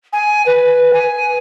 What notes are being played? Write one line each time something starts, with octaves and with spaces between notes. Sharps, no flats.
G#5
B4
G#5